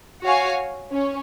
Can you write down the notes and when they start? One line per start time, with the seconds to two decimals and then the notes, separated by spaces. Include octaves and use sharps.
0.22 F#4 C#5 F5 G#5
0.91 C#4